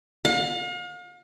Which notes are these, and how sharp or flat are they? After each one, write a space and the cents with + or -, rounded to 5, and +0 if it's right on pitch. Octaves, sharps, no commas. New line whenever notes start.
F5 +40